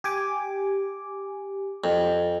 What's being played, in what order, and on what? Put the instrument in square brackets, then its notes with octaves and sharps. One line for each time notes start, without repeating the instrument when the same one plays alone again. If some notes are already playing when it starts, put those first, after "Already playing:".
[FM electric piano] G4 G#5 D6
[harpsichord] F2